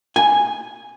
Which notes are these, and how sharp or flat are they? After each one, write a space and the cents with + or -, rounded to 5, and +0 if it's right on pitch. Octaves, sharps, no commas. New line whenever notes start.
G#5 -10